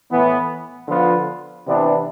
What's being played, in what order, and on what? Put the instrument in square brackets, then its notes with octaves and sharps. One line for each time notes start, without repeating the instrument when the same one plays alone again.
[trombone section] A2 E3 B3
D3 F3 B3 F4
C3 E3 B3 D4